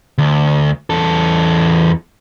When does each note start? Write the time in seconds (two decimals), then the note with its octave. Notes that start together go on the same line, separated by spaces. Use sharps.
0.18 D2
0.90 E2 A4